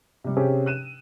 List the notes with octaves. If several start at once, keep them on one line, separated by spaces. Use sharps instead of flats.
C3 G3
C3 C4 C#4 G4 G#4
F#6 D#7 E7